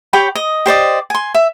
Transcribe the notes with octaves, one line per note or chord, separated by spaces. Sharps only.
G4 C#5 G5 B5
D#5
G4 C5 D5 D#5
G#5 C6
E5